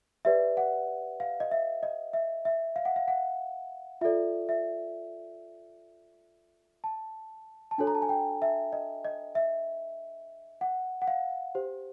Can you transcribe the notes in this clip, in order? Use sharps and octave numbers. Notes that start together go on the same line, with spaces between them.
G4 B4 D5 E5
F#5
F5
D#5
E5
D#5
E5
E5
F5
F#5
F5
F#5
F4 A4 D5 E5
E5
A5
A5
D4 F#4 A4 C#5 G#5
A#5
A5
G#5
G5
E5
D#5
D#5
E5
F#5
F#5
F5
G4 C5